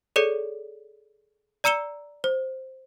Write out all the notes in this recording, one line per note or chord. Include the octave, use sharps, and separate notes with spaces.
G#4 A4 C#5 D5 C#7
D5 A#5 E6 C#7 E7 G7
C5